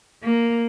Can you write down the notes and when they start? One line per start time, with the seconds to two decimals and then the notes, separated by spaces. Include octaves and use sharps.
0.23 A#3